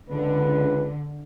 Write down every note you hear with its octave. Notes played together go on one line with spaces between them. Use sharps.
C#2 D3 B4